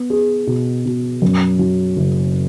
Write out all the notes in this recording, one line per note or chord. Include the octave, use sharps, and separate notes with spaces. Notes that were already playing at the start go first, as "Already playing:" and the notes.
Already playing: B3
G#4
B2
B2
F#2
F#3
F#1